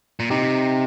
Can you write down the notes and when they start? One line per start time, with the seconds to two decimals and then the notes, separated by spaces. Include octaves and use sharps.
0.19 A#2
0.30 C3 D#4 G4